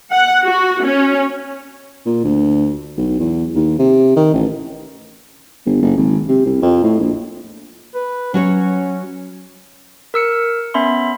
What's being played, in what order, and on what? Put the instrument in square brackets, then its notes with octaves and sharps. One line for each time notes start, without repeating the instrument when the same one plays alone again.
[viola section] F#5
F#4
C#4
[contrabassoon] A#2
D2
B1
E2
D#2
C3
D#3
A1
G1
F#1
G#1
C3
C2
F2
A2
A#1
[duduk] B4
[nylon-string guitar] F#3 F#4 C#5 [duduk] C#4
[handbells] A#4 E6 C#7
B3 C#4 E5 B5 C6